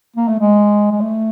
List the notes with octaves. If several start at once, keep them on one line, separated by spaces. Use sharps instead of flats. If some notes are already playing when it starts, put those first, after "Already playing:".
A#3
A3
G#3
G#3
A3